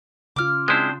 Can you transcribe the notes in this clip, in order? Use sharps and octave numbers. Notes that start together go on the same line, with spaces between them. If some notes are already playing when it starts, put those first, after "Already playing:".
C#3 F4 D6 F6
G#3 C4 D4 E4 C5